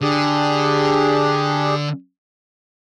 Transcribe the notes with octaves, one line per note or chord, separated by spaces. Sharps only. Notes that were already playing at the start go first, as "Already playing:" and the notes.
D3 D4 G4 G#4